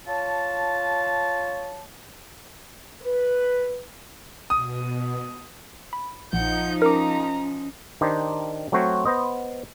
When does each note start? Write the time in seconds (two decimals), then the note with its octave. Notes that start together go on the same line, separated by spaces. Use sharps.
0.07 F4 C#5 A5
3.02 B4
4.50 B2 D#6
5.93 B5
6.33 A#1 F3 D#4 F#5 G6
6.82 C#4 A#4 A#5 D6
8.01 D#3 D4 D#4 G4 C5
8.72 F#3 A3 C4 F#4 C5 C#5
9.06 B3 C5 D#5